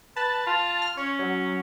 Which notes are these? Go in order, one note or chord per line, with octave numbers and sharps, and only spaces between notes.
B4 A5
F4
F6
C#4 C#5
F#3